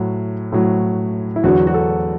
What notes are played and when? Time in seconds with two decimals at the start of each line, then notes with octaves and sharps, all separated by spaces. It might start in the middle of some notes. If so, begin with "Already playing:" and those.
Already playing: A2 F#3
0.52 A2 F#3
1.36 E4
1.44 E2 D3 F#3 F#4
1.67 F#4
1.74 A4